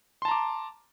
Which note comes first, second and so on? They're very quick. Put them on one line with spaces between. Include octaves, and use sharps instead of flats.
C6 A5 A#5 D6